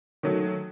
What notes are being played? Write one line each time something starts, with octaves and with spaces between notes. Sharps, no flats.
D#3 F#3 A3